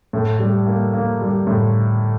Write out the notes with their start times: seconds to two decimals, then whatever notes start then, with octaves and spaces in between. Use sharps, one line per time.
0.13 A2
0.39 G3
0.67 A#3
0.93 A#3
1.21 G3
1.47 A2